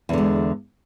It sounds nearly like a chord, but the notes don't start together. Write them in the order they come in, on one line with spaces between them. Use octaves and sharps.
E2 D3 G#3